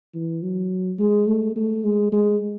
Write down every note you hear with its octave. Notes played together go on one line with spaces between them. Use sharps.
E3
F#3
G#3
A3
A3
G#3
G#3